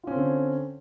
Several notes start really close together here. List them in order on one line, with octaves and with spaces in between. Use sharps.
F4 C#4 C4 D3